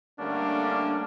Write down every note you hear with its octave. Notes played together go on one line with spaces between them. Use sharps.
D3 G3 A3 A#3 C#4 D4